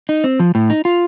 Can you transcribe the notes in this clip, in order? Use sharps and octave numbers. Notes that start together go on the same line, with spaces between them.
D#4
C4
F3
A2
D#4
F4